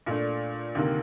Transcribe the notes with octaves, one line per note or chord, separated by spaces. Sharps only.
A#2 A3 D4
D2 C3 D#3 A#3